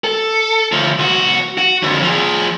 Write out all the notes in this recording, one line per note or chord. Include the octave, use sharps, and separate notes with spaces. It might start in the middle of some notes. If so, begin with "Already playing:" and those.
A4
D2 F3
C2 F#4
F#4
F2 D3
F3 G#4